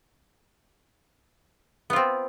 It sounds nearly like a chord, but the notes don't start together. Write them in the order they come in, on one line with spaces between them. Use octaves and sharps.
B3 F4 C4